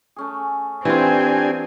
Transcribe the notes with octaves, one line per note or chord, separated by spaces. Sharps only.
A3 C#4 G#4
E3 C4 D4 F4 G4 G#5